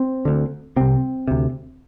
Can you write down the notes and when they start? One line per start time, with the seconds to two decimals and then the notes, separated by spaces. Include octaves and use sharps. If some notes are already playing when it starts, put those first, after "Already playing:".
Already playing: C4
0.25 D2 D3
0.76 C2 C3 C4
1.28 D2 C3